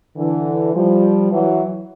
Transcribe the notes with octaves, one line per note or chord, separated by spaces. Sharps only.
D3 E3
F3 G3
E3 F#3